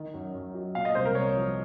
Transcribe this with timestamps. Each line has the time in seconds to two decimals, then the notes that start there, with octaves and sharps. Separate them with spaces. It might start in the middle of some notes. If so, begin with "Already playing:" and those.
Already playing: D#3
0.14 F#2
0.34 F#2
0.54 F#3
0.75 A#2 F5
0.85 D#5
0.95 C2 C5
1.05 A#4
1.15 C2 C#5
1.36 F3